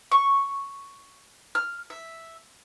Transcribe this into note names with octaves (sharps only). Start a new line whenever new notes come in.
C#6
F6
E5